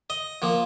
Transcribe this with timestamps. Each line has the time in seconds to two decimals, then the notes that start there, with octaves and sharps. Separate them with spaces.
0.10 D#5
0.42 F3 A#3